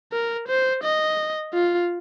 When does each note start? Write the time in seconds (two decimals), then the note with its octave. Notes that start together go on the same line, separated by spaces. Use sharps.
0.12 A#4
0.48 C5
0.83 D#5
1.53 F4